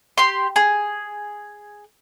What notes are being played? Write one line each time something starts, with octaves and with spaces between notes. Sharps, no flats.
G4 C6
G#4